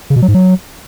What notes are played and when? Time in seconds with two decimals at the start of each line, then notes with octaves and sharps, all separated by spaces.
0.10 C#3
0.16 B2
0.22 F#3
0.28 G#2
0.34 F#3